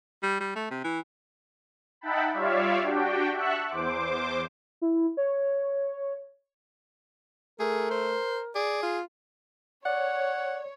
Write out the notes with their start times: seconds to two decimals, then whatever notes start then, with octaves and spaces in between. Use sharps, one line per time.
0.23 G3
0.41 G3
0.56 A3
0.71 C3
0.84 E3
2.01 D#4 E5 F#5 G5 A5 B5
2.34 G3 F4 C#5 D5 E5 F5
2.82 D4 F#4 G4 G5
3.33 E5 F#5 A5 C#6 E6 F#6
3.67 E2 C5 D6
4.81 E4
5.17 C#5
7.60 A3 G#4 A#4
7.91 C5
8.55 G#4 D5
8.83 F4
9.86 C#5 D5 F#5